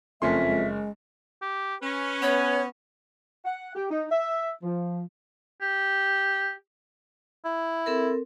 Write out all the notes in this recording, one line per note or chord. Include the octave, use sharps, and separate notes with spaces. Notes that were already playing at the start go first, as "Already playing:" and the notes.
F#1 F2 A3 C#4 E5 C6
G#3
G4
C#4 B4
B3 C#5
F#5
G4
D#4
E5
F3
G4
E4
C4 A4 A#4